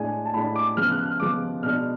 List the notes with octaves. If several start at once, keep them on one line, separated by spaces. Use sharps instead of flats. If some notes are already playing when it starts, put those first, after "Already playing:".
Already playing: A2 G#3 D4 G#5
A5
A2 G#3 D4 B5
D6
C#3 F3 G#3 B3 F6
F#6
F6
C#3 F3 G#3 B3 D6
B2 G#3 D4 F6